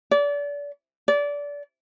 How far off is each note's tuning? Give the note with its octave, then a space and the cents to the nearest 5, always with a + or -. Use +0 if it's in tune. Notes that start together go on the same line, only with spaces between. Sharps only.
D5 -30
D5 -25